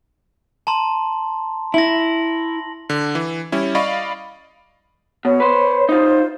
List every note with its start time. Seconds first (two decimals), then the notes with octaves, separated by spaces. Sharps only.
0.67 A5 A#5 C6
1.74 E4 A#6 F#7
2.90 D3
3.15 E3
3.52 G3 C#4 E4
3.75 D5 D#5 F5 B5 C#6
5.25 B2 C#5
5.40 B4 C5
5.89 D#4 F4 C5